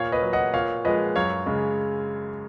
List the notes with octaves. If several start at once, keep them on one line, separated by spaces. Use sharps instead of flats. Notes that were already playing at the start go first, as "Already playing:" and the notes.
Already playing: A#2 C#5 F5
B4 D#5
F#3
D#5 F#5
A#2 C#5 F5
F3 G#3 B4 D#5
F#2 C#5 F5
C#3 G#3